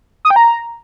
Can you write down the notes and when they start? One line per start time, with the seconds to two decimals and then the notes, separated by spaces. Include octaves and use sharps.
0.25 D#6
0.30 G5
0.36 A#5